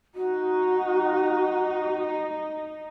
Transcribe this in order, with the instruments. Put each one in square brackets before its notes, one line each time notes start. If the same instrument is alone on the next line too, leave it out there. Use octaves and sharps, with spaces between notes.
[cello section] D#4 [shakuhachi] F#4